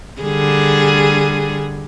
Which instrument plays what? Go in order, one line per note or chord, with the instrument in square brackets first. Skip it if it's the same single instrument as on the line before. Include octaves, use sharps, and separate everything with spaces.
[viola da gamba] D3 G3 G#4